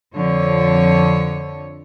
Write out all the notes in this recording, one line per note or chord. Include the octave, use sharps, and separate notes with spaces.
F2 D3 F3 C#5